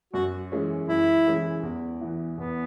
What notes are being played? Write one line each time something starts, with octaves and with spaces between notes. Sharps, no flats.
F#2 F#4
E3 G#3 C#4
F#2 E4
E3 G#3 C#4
E2
E3 B3
E2 B3